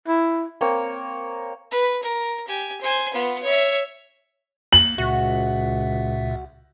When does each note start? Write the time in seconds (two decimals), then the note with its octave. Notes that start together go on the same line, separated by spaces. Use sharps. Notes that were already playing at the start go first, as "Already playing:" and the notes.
0.07 E4
0.61 A#3 C4 A#4 C#5
1.71 B4
2.03 A#4
2.48 G4 G#5
2.81 C5 G#5
3.14 B3 F4
3.42 C#5 E5
4.73 A#3 F#7
4.98 C#2 A#2 F#4 E5